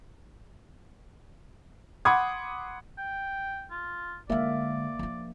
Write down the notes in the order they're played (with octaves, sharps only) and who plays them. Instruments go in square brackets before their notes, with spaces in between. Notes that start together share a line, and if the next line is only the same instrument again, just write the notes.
[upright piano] F#5 B5 C6 D6 D#6 G#6
[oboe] G5
F4
[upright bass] D3 G#3 [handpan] A#3 E5 F5 [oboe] D5
[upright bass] F3 D4